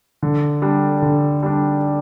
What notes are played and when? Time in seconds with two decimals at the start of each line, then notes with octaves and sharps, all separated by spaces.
0.23 D3
0.62 G3 D4
1.02 D3
1.43 G3 D4